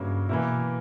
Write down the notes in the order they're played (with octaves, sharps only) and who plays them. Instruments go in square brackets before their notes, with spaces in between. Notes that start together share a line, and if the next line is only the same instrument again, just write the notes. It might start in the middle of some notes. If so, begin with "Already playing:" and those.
Already playing: [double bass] G2 [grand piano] C#3 F#3 A#3 C#4 E4
[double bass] B2 [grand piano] E3 A#3 E4